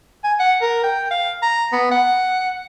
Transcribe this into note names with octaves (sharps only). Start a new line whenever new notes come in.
G#5
F#5
A#4
G5
F5
A#5
B3
F#5